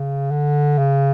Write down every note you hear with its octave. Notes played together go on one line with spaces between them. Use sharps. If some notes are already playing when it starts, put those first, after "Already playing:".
Already playing: C#3
D3
C#3